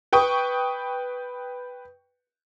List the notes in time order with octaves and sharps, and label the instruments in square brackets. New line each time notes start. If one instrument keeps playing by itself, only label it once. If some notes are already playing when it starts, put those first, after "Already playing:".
[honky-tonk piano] B4 G5 C#6 D#6